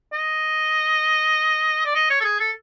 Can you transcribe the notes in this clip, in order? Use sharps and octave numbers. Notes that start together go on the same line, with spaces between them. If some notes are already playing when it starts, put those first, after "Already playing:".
D#5
D5
D#5
C#5
A4
G#4
A4